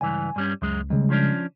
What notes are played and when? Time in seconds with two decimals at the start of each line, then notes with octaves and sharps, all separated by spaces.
0.01 C#2 G2 E3 G#5
0.36 G2 G3 C#4
0.62 C#2 F#2 G#3
0.90 D#2 C#3 G3 G#3
1.10 F3 C#4 D4